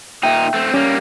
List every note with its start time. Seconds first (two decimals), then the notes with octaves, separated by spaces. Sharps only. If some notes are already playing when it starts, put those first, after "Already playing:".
0.23 A#2 D#4 E5 G5
0.54 A3 C4
0.74 G3 A#3 C#4